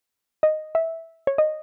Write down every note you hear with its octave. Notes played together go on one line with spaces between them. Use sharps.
D#5
E5
C#5
D#5